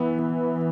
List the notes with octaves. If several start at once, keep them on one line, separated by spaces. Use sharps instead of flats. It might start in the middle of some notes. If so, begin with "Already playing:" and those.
Already playing: E3 B3
B3